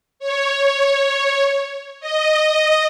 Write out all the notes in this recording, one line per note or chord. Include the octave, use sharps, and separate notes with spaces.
C#5
D#5